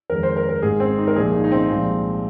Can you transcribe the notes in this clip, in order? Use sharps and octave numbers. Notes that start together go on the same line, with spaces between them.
F2 D#3 G#3 A#4
C5
A#4
A#4
G#1 G#2 G#3 G#4
C4
D#4
A#4
C2 A#2 F3 G#4
D#4
D#4
C4
C2 A#2 F3 G#3